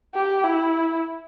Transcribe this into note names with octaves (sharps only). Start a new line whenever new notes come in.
G4
E4